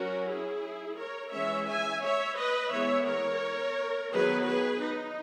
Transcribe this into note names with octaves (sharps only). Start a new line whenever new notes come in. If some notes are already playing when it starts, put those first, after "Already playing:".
Already playing: F#3 C#4 F#4 A#4
E4 G#4
A#4 C#5
E3 G#3 C#4 C#5 E5
E5 G#5
C#5 E5
B4 D#5
E3 G#3 B3 C#5 E5
A#4 C#5
D#3 F#3 B3 G#4 B4
G#4 B4
D#4